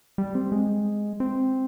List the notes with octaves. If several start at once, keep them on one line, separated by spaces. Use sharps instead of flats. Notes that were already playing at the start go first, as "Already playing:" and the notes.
G3
C4
G#3
C4